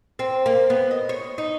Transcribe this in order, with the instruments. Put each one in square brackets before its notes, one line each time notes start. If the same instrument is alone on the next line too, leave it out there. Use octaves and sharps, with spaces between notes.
[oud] C4
A#3
B3
D#5
C#5
D#4